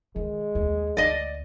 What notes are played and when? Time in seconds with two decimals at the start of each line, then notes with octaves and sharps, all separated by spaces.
0.16 D#3 G#3
0.55 D#2 A3
0.97 D2 D5 D#5